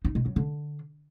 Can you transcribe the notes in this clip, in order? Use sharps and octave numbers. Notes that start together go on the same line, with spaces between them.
D#4
B2
F#3
D3